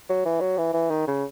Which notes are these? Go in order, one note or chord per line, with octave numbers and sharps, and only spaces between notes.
F#3
E3
F#3
E3
E3
D#3
C#3